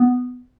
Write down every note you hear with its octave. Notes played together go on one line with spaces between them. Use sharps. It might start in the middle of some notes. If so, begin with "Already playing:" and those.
Already playing: B3